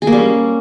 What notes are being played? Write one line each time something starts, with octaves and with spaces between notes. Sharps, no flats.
G#4
A#3
G3
C#4